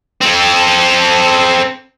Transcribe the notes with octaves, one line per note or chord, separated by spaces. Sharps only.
C4 A4